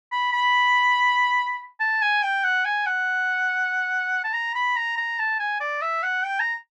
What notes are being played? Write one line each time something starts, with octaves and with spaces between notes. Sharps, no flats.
B5
B5
A5
G#5
G5
F#5
G#5
F#5
A5
A#5
B5
A#5
A#5
A5
G#5
D5
E5
F#5
G5
A#5